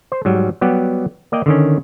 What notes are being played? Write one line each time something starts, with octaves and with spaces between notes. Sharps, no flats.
C5
G#2 F#3 G3
F#3 G3 B3 G4
A#3 D5 D#5 G5
D3 D#3 C#4